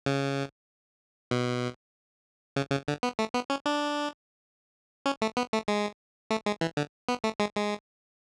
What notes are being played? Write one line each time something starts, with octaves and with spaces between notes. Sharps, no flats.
C#3
B2
C#3
C#3
D3
B3
A3
B3
C#4
D4
C#4
A3
B3
A3
G#3
A3
G#3
E3
D3
B3
A3
G#3
G#3